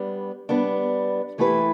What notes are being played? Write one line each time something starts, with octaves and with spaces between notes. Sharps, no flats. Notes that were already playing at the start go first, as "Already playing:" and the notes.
Already playing: G3 B3 D4
G3 B3 D4
E3 A3 E4 G4 B4